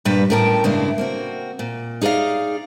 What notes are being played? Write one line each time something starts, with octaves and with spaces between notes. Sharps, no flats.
G2 A#2 G3 B4
A2 C#4 A#4 G5 A5
G2 C#3 G#3 A#3 D4 E4
A#3 C4 F#4
A#2
D#4 G#4 B4 D5 F5